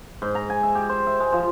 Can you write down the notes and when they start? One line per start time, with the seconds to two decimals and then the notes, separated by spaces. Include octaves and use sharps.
0.22 G#2
0.35 A#5
0.50 G#5
0.63 E5
0.75 G4
0.89 C5
1.07 E5
1.20 G#3
1.33 F3